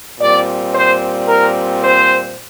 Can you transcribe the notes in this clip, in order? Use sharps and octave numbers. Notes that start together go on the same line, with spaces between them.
A#2 G3 C4 D5
C5
A#4
C5